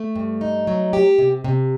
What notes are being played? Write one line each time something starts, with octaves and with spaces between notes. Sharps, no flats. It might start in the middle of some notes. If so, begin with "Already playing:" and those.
Already playing: A3
G2
D#4
F#3
G4
C3
C3